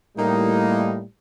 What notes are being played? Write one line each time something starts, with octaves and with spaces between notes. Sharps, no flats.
A2 G3 A#3 D#4